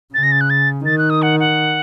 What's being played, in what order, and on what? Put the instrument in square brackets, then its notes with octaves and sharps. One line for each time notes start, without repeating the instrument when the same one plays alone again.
[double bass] C#3 [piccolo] A6
[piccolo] A#6
A6
F#6
A6
[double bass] D#3 [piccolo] A6
[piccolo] F#6
D#6
F#5
F#5